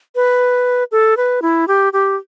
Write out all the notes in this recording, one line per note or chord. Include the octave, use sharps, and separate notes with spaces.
B4
A4
B4
E4
G4
G4